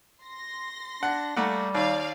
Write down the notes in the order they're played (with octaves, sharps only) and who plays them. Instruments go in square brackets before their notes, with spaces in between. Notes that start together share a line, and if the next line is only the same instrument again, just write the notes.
[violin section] C6 A#6
[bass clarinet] D4 [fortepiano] F#5
[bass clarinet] G3 [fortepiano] A3 A#3 F#5
[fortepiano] D#2 [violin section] D5 F5